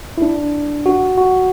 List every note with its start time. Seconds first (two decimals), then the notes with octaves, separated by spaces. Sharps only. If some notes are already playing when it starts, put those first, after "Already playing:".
0.18 E4
0.22 D4
0.86 F#4
1.18 F#4